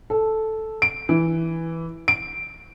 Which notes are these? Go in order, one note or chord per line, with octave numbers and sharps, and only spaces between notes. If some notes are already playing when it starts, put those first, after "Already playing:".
A4
D7
E3
D7